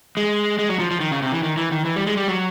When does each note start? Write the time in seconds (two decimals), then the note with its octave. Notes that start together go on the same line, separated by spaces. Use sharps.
0.17 G#3
0.59 G#3
0.69 F#3
0.79 F3
0.91 F3
1.00 D#3
1.11 C#3
1.22 C3
1.32 E3
1.43 D#3
1.57 E3
1.72 D#3
1.85 E3
1.96 G3
2.07 G#3
2.17 G3
2.28 F#3